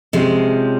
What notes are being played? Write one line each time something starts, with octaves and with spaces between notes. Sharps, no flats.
C3 F3 G#3 C#4